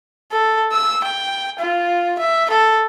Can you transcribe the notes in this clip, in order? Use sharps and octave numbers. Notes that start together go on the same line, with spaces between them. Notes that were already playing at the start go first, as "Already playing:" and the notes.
A4
E6
G5
F4
E5
A4